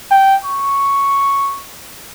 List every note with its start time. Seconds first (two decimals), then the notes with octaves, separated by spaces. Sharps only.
0.11 G5
0.45 C#6